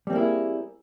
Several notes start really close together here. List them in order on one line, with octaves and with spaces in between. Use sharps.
G3 C4 A#3 E4 G#4